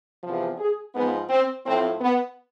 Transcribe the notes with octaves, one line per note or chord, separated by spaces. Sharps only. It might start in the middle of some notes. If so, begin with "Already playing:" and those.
E2 C3 F3
G#4
G#2 F3 B3
C4
A2 F3 C4
B3